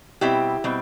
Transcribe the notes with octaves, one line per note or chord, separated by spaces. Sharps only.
B2 G3 C4 E4 G4
B2 G3 C4